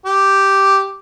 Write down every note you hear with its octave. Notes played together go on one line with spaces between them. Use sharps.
G4